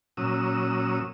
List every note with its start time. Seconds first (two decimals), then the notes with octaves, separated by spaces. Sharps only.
0.17 A#2 F#3 C#4 D#6 E6